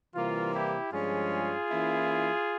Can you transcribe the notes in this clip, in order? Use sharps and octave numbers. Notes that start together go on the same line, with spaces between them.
C3 E3 G3 A#3 F4
E4 G4
G2 F3 G#3 C#4 F4 G#4
E3 A#3 C#4 E4